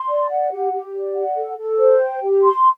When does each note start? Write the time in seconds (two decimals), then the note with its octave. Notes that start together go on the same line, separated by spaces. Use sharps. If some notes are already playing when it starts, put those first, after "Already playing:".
Already playing: C6
0.08 D5
0.30 F#5
0.51 G4
0.72 G4
0.94 D5
1.15 F#5
1.36 A4
1.58 A4
1.78 C5
2.00 G5
2.22 G4
2.42 C6